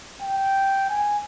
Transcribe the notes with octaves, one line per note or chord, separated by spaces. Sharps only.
G5
G#5